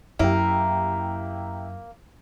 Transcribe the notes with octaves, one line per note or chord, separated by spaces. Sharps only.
F#2 A#3 E4 G4